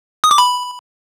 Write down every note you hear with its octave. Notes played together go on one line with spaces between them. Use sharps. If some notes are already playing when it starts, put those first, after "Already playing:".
D#6
D6
B5